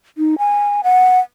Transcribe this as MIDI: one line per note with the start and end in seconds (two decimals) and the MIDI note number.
0.18 0.38 63
0.38 0.81 80
0.84 1.20 78